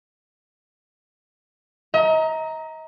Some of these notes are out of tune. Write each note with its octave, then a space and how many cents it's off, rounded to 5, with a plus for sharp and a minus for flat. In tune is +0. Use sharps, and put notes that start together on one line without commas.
D#5 +40 A#5 +0